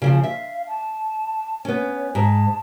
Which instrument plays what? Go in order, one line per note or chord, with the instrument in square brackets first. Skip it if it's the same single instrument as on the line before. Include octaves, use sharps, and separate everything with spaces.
[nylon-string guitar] C#3 E3 F3 [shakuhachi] F4
[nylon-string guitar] E5 [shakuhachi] F5
[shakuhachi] A5
[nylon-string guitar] B3 C#4 [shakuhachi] C#5
[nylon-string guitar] G#2 [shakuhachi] A5